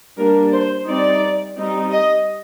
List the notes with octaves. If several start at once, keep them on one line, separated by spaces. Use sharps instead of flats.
G3 A#3 D4 A#4
C5
G3 C4 D#4 D5
G3 C4 D#4
D#5